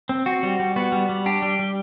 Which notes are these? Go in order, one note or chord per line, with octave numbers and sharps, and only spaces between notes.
C4
C4 F#4
G3
G3
B3 F#4
G3
G3
D4 G4
G3
G3